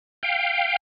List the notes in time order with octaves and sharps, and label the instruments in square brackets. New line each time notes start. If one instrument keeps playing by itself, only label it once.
[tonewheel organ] F5 G5